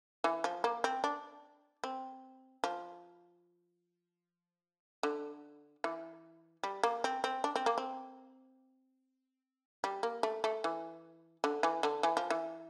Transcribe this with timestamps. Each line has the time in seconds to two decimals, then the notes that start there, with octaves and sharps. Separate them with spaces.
0.24 E3
0.44 F3
0.64 A#3
0.84 C4
1.04 D4
1.84 C4
2.64 F3
5.03 D3
5.84 E3
6.63 G3
6.83 A#3
7.04 C4
7.24 C4
7.44 D4
7.56 C4
7.66 A#3
7.78 C4
9.84 G3
10.03 A#3
10.23 A3
10.44 A3
10.64 E3
11.44 D3
11.63 E3
11.83 D3
12.03 E3
12.17 F3
12.30 E3